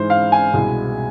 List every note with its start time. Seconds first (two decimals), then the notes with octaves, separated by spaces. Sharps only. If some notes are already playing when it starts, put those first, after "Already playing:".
Already playing: G#2 E3 G#3 C5
0.10 F5
0.32 G#5
0.54 C2 B2 G#3